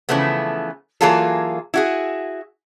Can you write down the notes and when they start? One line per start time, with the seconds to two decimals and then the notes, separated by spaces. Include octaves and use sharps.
0.09 C#3 E3 F3 A3 B3
1.01 E3 F#3 A#3 F4 G#4 A4
1.74 E4 F#4 G#4